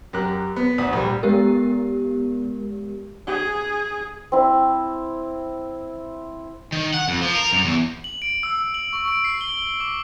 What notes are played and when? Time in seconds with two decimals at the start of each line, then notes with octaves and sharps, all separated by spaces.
0.13 F#2 G4 A#4 F#6
0.56 B3
0.78 D2 F#5 D#6
0.93 A#1 G3
1.23 G#3 B3 G4 A#4
3.27 G#4
4.32 C4 E4
6.72 D#3
6.94 F#5
7.08 F2
7.22 F3
7.35 A#4
7.53 F#2
7.65 E2
8.04 F#7
8.22 D7
8.43 E6
8.74 F#7
8.93 C#6
9.08 D7
9.24 C7
9.41 G7
9.80 D6